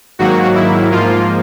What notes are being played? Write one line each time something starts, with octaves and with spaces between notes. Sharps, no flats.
G#2 D#3 F#3 A#3 F#4
E4
G#2 F3 A#3 F4